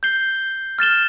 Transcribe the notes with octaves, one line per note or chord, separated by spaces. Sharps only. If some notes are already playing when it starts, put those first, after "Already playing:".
G6 C7 G7
F6 A6 E7 G7